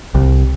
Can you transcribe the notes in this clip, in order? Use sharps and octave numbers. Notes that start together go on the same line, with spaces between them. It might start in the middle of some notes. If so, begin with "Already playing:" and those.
C2